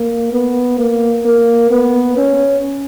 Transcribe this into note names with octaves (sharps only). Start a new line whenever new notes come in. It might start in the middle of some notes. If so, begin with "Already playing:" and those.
Already playing: A#3
B3
A#3
A#3
B3
C#4